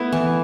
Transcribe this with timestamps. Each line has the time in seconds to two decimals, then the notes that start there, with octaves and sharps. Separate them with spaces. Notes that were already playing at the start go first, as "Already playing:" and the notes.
Already playing: A3 B3 E4
0.12 E3